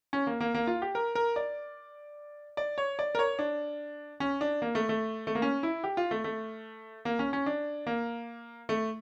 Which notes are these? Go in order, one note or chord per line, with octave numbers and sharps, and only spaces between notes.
C#4
A#3
A#3
A#3
F4
G4
A#4
A#4
D5
D5
C#5
D5
A#4
C#5
D4
C#4
D4
A#3
A3
A3
A3
A#3
C#4
E4
G4
F4
A3
A3
A#3
C#4
C#4
D4
A#3
A3